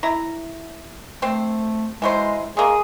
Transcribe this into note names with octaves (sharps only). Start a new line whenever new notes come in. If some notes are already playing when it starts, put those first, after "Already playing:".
E4 A#5
A3 C4 C5
E3 F#3 G#3 C5
G#3 A#3 G#4